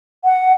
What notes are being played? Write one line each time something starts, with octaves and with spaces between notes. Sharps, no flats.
F#5